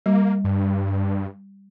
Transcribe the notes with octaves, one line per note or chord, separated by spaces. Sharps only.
G3 A#3
G2